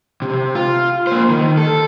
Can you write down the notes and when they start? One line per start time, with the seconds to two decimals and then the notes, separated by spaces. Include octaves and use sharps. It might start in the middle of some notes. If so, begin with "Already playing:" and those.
0.22 C3
0.55 F4
1.07 A#3 C5
1.30 D#3
1.58 A4